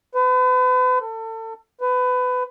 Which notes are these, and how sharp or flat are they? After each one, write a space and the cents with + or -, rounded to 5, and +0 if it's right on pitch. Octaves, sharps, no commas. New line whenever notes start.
B4 +40
A4 +30
B4 +25